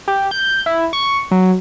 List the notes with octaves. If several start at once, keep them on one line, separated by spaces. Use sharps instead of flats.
G4
G6
E4
C#6
F#3